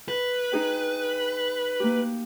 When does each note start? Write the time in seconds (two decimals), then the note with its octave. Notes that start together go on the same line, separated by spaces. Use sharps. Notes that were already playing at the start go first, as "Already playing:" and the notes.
0.08 B4
0.52 D#4 G#4 G5
1.80 A#3 G4